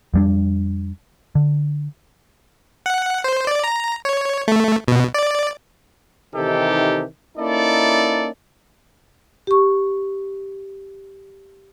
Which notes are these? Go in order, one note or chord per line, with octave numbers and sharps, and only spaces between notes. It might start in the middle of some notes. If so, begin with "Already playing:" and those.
F2 G3 D4
D3
F#5
C5
D5
A#5
C#5
A3
B2
D5
C3 D#3 E3 D#4 G4 A4
A#3 C#4 D#4 E4 A4 D5
G4 C#6